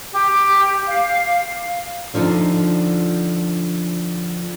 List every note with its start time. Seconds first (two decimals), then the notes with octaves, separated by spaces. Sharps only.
0.11 G4
0.86 F5
2.14 D3 F3 D4 D#4